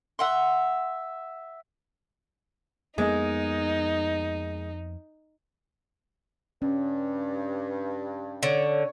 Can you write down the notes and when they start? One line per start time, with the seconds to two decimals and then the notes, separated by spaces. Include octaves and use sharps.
0.19 E5 F#5 C6
2.98 F2 G#3 A#3 B3 D#4
6.62 G2 C#4
8.43 D3 C#5